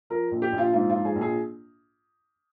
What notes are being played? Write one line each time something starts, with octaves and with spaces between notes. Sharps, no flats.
F3 A#4
A#1
G4
A#1
F4
G#2 F4
F4
F3
G#4
A#1
G#4